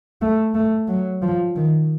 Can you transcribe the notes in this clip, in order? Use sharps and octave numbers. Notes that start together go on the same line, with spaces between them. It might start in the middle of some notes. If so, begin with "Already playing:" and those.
A3
A3
F#3
F3
D#3